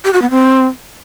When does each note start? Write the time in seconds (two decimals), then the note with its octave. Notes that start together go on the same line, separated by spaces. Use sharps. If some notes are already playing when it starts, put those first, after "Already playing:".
0.05 G4
0.13 F#4
0.22 B3
0.30 C4